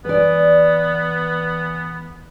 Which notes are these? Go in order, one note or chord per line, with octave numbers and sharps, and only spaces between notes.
E3 B3 B4 D5